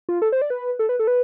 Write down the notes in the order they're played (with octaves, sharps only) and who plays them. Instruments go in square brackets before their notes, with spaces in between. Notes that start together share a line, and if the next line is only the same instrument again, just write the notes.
[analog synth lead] F4
A4
C5
D5
B4
A4
B4
A4
B4